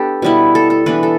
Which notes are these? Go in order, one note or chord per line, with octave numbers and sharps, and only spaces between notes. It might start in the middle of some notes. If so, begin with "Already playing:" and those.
Already playing: B3 D4 G4 A4
B2 G3 B3 E4
A4
A4
E3 B3 D4 B4
A4